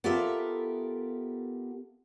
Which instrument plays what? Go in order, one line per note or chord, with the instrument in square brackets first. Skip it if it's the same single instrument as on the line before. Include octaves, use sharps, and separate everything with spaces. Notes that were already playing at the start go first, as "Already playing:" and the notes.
[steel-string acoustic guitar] B3 F4 G4 A4 A#4 E5